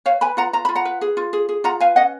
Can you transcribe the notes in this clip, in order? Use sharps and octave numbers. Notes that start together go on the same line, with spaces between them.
B4 C#5 F5
B4 G#5 B5
F4 F#5 A#5
F4 A#5
F4 B5
F#5 A#5
B4
G#4
F4
G#4
G#4
F4 F#5 A#5
B4 F5 G#5
C#4 D#5 F#5